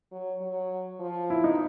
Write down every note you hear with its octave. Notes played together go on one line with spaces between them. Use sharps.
F#3
F#3
F3
E4
D#4